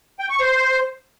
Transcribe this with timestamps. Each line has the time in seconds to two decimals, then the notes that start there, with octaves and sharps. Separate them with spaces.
0.19 G5
0.29 C#6
0.40 C5